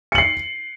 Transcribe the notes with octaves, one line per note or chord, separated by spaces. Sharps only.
C7 C#7 F#7